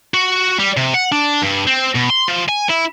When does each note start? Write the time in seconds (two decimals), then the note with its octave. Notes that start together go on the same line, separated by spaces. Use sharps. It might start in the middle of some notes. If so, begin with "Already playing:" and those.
0.14 F#4
0.60 G3
0.77 C3
0.94 F#5
1.12 D4
1.42 G2
1.67 C4
1.95 B2
2.10 C6
2.28 F3
2.49 G#5
2.69 E4